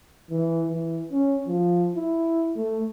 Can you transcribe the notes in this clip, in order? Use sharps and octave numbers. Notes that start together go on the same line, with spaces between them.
E3
E3
C#4
F3
E4
A3